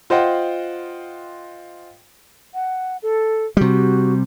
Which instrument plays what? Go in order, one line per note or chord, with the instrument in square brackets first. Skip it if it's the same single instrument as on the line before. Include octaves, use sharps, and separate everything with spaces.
[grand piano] F4 C5 D#5 F#5 G5
[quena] F#5
A4
[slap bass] C3 G3 [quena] F#4